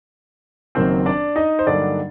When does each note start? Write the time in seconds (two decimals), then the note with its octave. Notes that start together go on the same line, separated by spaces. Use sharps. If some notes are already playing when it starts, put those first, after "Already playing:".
0.75 F#1 F#2 D#3 F#3 A#3 C4 C5
1.06 D4 D5
1.36 D#4 D#5
1.59 C5
1.67 G2 D3 F#3 A#3 D4 D#4 D5